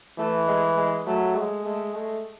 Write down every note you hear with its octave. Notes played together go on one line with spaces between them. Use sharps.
E3 A3
G#3
G#3
F#3 A3
G#3
G#3 A3
G#3 A3